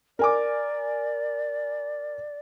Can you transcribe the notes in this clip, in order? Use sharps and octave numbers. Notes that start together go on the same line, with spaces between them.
A#4 D5 G#5 D6